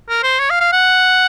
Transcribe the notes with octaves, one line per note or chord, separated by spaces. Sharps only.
A#4
C5
C#5
F5
F5
F#5